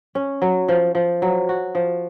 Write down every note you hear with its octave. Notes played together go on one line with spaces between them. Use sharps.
C#4
F#3
F3
F3
F#3
F#4
F3